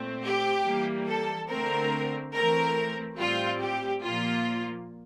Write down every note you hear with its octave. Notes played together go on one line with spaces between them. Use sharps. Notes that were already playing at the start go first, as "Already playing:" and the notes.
Already playing: A#2 A3 C4
G4
E3 G3 A#3
A4
D3 A3 C4 A#4
E3 A3 C4 A#4
A2 G3 C4 F4
G4
A#2 F3 A#3 F4